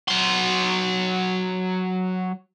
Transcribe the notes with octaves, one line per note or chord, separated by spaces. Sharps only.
F#3 C6